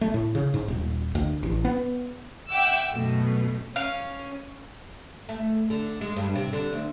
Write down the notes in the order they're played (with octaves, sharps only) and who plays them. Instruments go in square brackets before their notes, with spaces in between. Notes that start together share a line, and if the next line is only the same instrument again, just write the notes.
[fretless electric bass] A3
A2
C#3
G#2
D#1
D2
A1
B3
[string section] E5 F#5 G5 D6 E6
F#2 B2 A3
[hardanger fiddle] C#4 [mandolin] F5
[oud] A3
D3
G#3
G2
C3
D3
D2